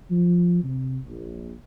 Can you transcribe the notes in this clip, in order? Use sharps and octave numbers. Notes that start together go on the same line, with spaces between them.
F3
C3
A#1